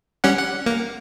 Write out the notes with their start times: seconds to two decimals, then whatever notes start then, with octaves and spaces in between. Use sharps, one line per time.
0.24 G3 C#4 F#5
0.38 F#5
0.66 A#3